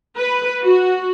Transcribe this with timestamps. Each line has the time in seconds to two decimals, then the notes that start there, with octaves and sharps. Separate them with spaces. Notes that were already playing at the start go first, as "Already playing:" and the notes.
0.17 B4
0.63 F#4